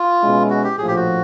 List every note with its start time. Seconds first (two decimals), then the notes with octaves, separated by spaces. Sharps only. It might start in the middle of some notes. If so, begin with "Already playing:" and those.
Already playing: F4
0.22 B2 G#3 C#4 E4
0.50 F#4
0.64 G4
0.78 A#1 A2 F3 G#4
0.88 G4
0.96 F#4